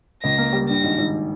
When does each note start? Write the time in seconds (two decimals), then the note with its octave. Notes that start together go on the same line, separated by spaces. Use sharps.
0.23 C#2 A#6
0.38 A#3
0.53 G3
0.69 G2 A#6
0.83 G#1
0.98 G#1